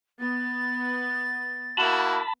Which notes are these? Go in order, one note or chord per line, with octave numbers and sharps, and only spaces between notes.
B3 A6
A#3 E4 F#4 A5 B5